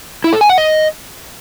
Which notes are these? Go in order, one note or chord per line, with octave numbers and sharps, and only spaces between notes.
E4
A4
G#5
F#5
D#5